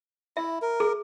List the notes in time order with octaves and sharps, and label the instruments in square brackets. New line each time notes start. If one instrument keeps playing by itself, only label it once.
[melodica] E4 [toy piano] E5
[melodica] A#4
[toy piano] G#4